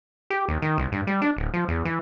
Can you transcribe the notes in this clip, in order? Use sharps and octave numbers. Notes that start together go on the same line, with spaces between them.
G4
D#2
D#3
C2
G2
G3
D4
D1
F3
E2
E3